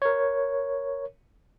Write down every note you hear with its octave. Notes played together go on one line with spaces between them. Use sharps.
A#4 C#5